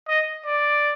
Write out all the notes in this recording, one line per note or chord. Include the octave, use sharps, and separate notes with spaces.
D#5
D5